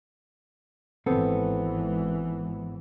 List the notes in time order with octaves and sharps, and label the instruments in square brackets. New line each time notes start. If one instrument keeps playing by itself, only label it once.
[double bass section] G#1 E3 [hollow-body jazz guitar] B3 C4 A4